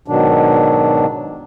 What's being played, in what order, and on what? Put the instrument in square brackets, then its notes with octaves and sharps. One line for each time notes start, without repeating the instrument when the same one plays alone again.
[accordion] G#2 B2 D#3 F#3 D4